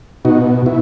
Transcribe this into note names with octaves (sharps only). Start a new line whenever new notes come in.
B2 D#4 F#4
B2 E4